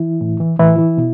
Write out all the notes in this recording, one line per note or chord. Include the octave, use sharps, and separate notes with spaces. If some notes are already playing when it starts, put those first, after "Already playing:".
Already playing: E3 E4
A2
E3
A2 E3 E4
E3
B2